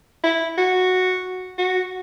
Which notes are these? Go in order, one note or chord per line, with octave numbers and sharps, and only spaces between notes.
E4
F#4
F#4